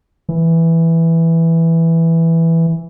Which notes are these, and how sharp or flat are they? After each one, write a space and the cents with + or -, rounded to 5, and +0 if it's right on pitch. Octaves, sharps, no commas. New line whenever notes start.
E3 +0